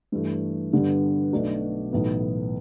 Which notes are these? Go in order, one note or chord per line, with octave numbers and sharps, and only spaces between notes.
G2 E3 A3
G2 D3 G3 B3
B1 B2 A3 D4 F#4
B1 A2 E3 B3